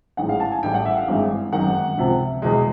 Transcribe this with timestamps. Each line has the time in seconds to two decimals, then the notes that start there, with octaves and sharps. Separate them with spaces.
0.17 A1 G#2 E3 G#3 F#5
0.29 F5
0.40 A5
0.52 G#5
0.63 A1 A2 E3 G3 G5
0.74 F#5
0.85 E5
0.96 F5
1.08 G#1 G2 E3 G#3
1.52 G#1 F#2 D#3 F#5
1.97 C#2 C3 F3
2.42 E2 B2 G#3